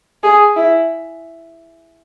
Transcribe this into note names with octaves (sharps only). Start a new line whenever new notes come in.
G#4
E4